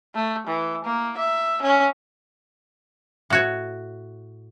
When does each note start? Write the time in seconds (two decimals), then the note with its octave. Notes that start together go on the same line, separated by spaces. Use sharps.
0.15 A3
0.47 E3
0.85 A#3
1.18 E5
1.63 C#4
3.30 A2 F#4 C#5